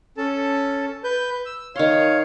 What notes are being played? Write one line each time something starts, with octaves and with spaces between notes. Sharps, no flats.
C#4 A4 A5
B4 G6
E6
D#3 C#5 F5 C6